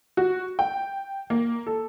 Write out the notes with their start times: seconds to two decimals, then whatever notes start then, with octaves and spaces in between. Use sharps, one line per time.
0.17 F#4
0.59 G5
1.30 A#3
1.66 A4